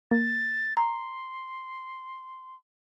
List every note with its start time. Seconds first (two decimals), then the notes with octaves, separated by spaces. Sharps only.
0.11 A#3 A6
0.77 A#5 C6